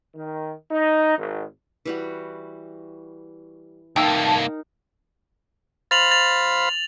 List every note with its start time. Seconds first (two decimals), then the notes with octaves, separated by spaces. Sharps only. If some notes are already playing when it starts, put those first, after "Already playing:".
0.15 D#3
0.71 D#4
1.17 G#1
1.86 E3 G3 F#4
3.96 C2 A#3 D#4 A#4 G5 A5 E6
5.91 C5 F5 B5 A6 F7 F#7
6.11 A6 F7